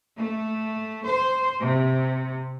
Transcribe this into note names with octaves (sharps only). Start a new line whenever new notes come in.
A3
C5
C3